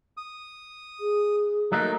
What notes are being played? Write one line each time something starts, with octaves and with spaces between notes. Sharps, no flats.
D#6
G#4
F#3 A3 A#3 D#4